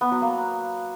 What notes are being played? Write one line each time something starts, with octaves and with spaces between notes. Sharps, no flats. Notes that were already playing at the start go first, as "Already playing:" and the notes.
B3
F#3
A#3